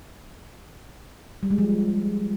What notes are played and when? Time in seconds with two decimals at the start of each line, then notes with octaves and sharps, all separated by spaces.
1.43 G3
1.51 G#3
1.58 F3